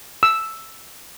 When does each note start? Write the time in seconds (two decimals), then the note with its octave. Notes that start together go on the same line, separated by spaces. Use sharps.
0.23 E6